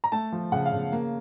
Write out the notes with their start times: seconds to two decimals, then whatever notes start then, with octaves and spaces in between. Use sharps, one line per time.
0.04 A#5
0.12 A3 A5
0.32 F3
0.52 C#3 F#5
0.65 F5
0.73 C#3
0.92 A#3